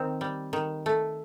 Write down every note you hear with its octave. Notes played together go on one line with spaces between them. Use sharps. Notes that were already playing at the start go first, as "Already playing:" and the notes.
Already playing: D#3 C4
G3
D#3
A3